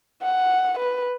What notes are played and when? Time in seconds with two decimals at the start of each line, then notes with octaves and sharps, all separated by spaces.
0.22 F#5
0.79 B4